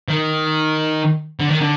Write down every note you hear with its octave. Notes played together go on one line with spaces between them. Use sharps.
D#3
D3
D#3
D3